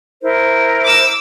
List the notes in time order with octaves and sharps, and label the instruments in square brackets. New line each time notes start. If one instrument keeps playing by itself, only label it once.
[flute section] E4 A#4 C5
[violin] D6 E6